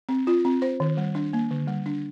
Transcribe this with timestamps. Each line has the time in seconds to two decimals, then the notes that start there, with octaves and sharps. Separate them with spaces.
0.09 C4
0.27 F4
0.45 C4
0.62 C5
0.80 D#3
0.97 G3
1.15 D4
1.33 A#3
1.51 D3
1.68 G3
1.86 D4